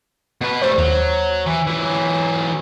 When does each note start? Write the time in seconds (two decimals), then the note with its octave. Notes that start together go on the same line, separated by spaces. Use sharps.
0.41 B2 B4
0.62 G3 A3 C5
0.78 D#2 F#3
1.46 E3
1.67 E3 F#3